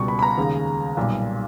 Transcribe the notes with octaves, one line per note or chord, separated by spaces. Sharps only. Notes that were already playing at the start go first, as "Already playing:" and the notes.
Already playing: C#2 B2 G3 C#6
B5
B5
A#5
D#2 C#3 G#3
B1 A#2 G3